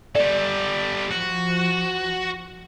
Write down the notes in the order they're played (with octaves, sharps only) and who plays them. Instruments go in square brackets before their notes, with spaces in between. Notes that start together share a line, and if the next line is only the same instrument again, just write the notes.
[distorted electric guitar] G3 A4 [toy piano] D5
[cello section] F3 [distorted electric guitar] F#4